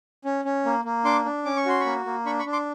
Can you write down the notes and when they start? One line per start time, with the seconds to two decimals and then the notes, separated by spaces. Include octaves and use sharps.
0.25 C#4
0.45 C#4
0.65 A#3
0.85 A#3
1.05 D4 C6 D6
1.25 D4
1.45 C#4 D6
1.57 C#6
1.66 F#4 C6
1.80 B5 C#6
1.86 A#3
2.06 A#3
2.26 D4 B5 C#6
2.39 B5 C#6
2.46 D4
2.52 C6 D6